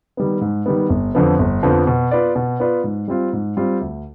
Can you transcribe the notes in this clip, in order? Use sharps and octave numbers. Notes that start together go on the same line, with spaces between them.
D#3 G3 B3
G#2
D#3 G3 B3
G1
F2 D3 F3 B3
G1
F2 D3 F3 B3
B2
B3 F4 B4 D5
B2
B3 F4 B4 D5
G#2
G3 C4 F4
G#2
G3 C4 F4
D2